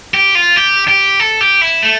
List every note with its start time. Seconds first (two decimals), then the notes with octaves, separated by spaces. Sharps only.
0.14 G4
0.35 F4
0.56 G4
0.88 G4
1.20 A4
1.41 G4
1.61 E4
1.83 A3